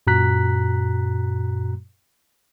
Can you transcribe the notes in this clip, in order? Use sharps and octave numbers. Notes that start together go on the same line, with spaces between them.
F#2 A#2 F#4 A#5 F#6 B6